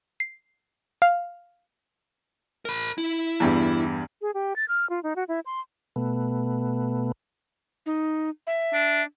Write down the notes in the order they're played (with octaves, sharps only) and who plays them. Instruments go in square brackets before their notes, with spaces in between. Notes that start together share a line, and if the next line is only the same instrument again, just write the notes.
[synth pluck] C7
F5
[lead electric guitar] A#4 B5
E4
[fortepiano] E2 G2
[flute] G#4
G4
A6
F6
F4
D#4
F#4
E4
C6
[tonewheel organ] B2 A3 B3
[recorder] D#4
E5
[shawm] D4